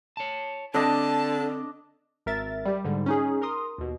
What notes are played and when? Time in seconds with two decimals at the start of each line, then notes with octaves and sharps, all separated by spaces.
0.17 C#5 A5
0.74 D3 C4 D4 D5 D#5 A5
2.26 G#1 A#4 E5 A6
2.65 G3 G4
2.85 G#2 D3 G3
3.06 C#4 D#4 G#4
3.42 A#4 A#5 C6 D#6
3.78 D#2 B2